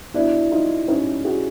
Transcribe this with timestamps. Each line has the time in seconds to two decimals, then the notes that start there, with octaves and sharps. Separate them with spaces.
0.14 B2 D4 E4
0.51 D#4 F4
0.88 C#4 D#4
1.25 F#4 G#4